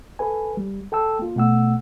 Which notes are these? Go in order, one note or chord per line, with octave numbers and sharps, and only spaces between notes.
A4 B4 G#5
G3
A4 G5 A5 E6
A#3 F4
B2 A3 F#5 E6